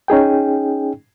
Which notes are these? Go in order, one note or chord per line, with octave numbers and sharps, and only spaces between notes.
C#4 D#4 G#4 G5